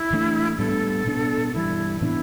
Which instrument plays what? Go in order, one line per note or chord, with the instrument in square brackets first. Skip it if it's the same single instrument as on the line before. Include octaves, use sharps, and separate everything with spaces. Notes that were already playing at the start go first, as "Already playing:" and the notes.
Already playing: [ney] E4
[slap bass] A2 E3 A3 D4
[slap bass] A2 G3 B3 D4 [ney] A4
[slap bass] B2 B3 D4
[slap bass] G2 E3 G3 [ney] E4
[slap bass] A2 E3 B3 D4 [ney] E4